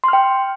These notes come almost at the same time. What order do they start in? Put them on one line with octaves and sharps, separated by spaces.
C6 F6 G5